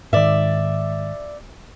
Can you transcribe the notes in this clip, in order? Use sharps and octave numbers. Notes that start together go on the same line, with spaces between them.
G#2 D#3 D5 E5